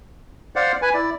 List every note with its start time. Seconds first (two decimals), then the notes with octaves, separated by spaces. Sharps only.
0.56 C5 D5 F5 F#5
0.82 B4 G#5
0.94 E4 D5